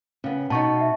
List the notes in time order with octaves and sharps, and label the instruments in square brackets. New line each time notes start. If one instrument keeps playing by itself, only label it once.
[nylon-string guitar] C#3 B3 [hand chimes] C#4
[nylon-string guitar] B2 D#4 [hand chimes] A5 C#6
[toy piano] E5 F#5